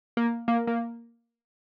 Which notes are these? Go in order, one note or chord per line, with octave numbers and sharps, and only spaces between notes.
A#3
A#3
A#3